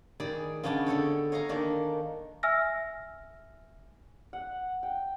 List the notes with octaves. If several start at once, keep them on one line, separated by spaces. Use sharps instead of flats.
D#3 G#4 D5 B5
C#3 B3 C#4 D4 G5 A5
D3 A4 C#5 G5
C#5 D#5 F5 G#5 A#5
D#3 A#3 D4
E5 G#5 E6 F6 A#6
F#5
G5